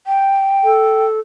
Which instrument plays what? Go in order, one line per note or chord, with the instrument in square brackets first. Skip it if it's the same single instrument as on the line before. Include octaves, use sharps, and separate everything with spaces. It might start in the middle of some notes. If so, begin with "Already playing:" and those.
[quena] G5
[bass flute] A4